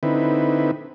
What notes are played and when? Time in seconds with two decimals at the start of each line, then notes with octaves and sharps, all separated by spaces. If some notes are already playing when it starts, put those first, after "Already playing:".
0.03 D3 C4 D#4 E4 B4